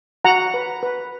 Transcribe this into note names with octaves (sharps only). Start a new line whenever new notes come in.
F#4 F#5 A#5
B4
B4